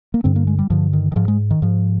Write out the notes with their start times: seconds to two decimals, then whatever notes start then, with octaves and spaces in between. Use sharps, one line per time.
0.14 A#3
0.24 G2 D3 C4
0.36 A#3
0.47 G#3
0.59 G3
0.70 G2 D3 F3
0.93 D#3
1.12 D#3
1.16 G#2 F3
1.28 G#3
1.51 D#3
1.62 G#2 F3